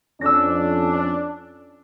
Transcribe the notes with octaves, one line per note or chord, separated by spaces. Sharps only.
F2 C#4 D4 E6 A#6